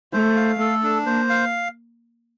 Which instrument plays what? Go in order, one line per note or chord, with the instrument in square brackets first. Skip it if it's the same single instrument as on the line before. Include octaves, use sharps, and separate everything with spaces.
[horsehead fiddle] A3 [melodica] C5
[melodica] F5
[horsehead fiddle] A3 [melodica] A4
[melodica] D4
[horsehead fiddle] A#3 [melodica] C5
[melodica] F5